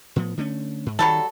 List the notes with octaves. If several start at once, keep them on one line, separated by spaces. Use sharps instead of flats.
A2 F3 B3
D3 A3 C#4
G#2
D#3 F#3 G3 A4